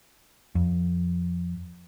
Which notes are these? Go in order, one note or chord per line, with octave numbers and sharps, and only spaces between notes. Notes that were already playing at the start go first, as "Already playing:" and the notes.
F2